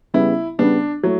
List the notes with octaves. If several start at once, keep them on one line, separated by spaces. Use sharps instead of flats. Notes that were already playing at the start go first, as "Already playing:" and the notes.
C#3 G3 B3 E4
C#3 G3 B3 D4
F#3 A3 E4